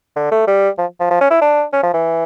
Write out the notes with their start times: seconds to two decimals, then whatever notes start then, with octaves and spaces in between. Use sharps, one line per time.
0.16 D3
0.31 A3
0.47 G3
0.78 F3
1.00 F3
1.10 F3
1.21 C#4
1.30 E4
1.41 D4
1.73 C#4
1.83 F3
1.94 E3